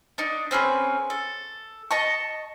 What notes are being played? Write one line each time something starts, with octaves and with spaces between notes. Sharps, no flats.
D4 D#4
C4 C#4 G#4 B4
A4
D#5 A5 C#6